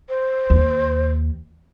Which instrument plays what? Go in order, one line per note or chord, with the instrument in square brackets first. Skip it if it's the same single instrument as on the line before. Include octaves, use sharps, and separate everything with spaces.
[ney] C5
[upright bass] D#2